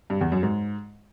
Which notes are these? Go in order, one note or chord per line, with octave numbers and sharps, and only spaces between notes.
G2
E2
F#2
G#2